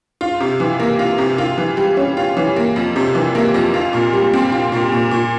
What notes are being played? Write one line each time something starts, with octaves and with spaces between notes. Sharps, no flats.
F4
C3
E3
A#3
F4
C3
F4
E3
G3
C#4
F4
E3
A#3
F2
C3
E3
A#3
F2
F4
A#2
G3
C4
F4
A#2
A#2
A#2